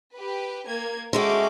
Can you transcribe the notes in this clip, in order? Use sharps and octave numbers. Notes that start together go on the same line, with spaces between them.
G4 B4
A#3 G#6
G#3 A3 C#4 F#4 G5 D6